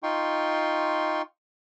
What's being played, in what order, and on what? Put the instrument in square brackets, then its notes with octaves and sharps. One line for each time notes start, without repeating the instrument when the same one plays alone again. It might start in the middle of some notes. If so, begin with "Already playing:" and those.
[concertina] D#4 F4 G5 C6 C#6